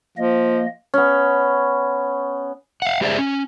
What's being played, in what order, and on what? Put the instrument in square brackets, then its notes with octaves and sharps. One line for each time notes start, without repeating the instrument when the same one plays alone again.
[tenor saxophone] F3 [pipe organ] A#3 D#5
[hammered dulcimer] B3 C#4
[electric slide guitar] F5 F#5
G#3 G4 G#4 C5 D5 E5
C#4